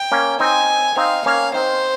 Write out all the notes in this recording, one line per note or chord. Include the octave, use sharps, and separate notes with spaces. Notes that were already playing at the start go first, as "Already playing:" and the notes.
Already playing: G5
A#3 C#4
C4 D#4 G#5
C4 D#4 F5
A#3 C#4 F5
C4 D#4 C5